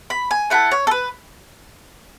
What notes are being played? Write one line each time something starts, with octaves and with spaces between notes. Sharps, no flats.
B5
G#5
A3 E4 A4 F#5
C#5
A4
B4